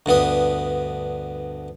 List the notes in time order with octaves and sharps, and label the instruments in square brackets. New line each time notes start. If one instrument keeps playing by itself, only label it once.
[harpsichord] D2 G2 B3 D#6